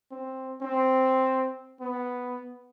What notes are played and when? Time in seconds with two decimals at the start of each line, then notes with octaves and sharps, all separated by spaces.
0.11 C4
0.62 C4
1.81 B3